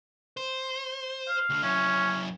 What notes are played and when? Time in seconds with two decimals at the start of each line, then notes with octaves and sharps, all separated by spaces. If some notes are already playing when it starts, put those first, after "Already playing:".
0.37 C5
1.28 F5
1.50 D2 D3
1.63 F#2 C#4 E4